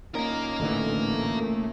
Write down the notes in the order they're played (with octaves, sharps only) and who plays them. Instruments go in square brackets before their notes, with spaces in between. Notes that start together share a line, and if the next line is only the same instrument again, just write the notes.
[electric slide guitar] A#2 C#4 D#4 [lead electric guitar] A#3 A#4
[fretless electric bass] A1 D3 E3 [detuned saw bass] A3